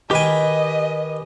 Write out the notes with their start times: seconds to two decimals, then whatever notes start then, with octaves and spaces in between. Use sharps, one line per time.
0.11 D#3 G4 B4 D#5 G5 G#5